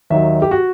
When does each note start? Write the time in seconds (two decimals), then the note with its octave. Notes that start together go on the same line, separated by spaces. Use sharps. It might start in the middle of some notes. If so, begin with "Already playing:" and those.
0.10 D#2 D#3 F#3 E5
0.42 G4
0.51 F#4